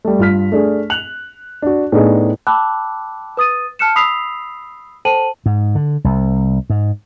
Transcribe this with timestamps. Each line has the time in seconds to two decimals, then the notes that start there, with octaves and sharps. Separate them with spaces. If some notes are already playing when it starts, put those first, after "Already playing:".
0.05 G3 A3
0.19 G2 F4 F6 B6
0.52 A3 D4 G#4
0.90 F#6 F7 F#7
1.62 D4 F#4
1.92 A2 B3 D4 D#4 G#4
2.47 G5 A5 B5 D6 E6 F#6
3.37 B4 D#6 A6 D#7
3.79 A5 F6 F#6 C#7 E7
3.96 B5 D#6 E6 B6 C7 F7
5.05 A4 C5 G5 A5 D#7 F#7
5.46 G#2
5.75 D3
6.04 C2
6.70 G#2